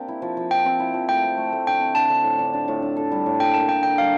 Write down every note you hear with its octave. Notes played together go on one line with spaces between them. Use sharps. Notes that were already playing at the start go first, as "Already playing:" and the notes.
Already playing: A#3 C4 D4 G4 D5
E4
F3
F3
F3 G5
C4
E4
F3
A3 G5
C4
A3
A3
D3 G5
C4
D3 A5
D3
A2
D4
D4
A2
D4
A4
G3
A2
D3 G5
A#3 A5
D3 G5
D3 G5
G3 F5